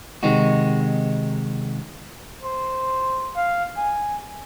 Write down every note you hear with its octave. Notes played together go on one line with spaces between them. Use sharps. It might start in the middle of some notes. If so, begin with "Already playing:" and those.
C3 D#3 G#3 C4 D#4 F#4
C5
F5
G#5